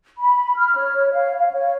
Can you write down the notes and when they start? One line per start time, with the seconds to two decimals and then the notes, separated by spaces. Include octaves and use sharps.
0.18 B5
0.56 F6
0.76 C#5
1.12 F5
1.38 F5
1.52 C#5